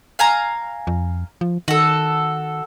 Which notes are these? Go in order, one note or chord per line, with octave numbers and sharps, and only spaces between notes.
F5 G#5 A#5
F2
F3
D#3 F#4 A4